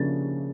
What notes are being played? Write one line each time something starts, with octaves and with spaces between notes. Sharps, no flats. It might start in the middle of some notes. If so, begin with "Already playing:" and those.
Already playing: C#3 F3 A#3 D4 A6